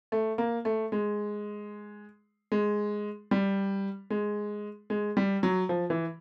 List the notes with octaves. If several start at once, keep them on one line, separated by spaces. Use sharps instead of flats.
A3
A#3
A3
G#3
G#3
G3
G#3
G#3
G3
F#3
F3
E3